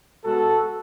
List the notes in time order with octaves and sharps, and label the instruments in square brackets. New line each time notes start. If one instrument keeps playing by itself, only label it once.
[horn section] B2 G#3 B3 F#4 A4